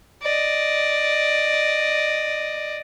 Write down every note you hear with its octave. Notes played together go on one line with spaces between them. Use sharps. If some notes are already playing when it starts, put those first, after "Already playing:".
D5 D#5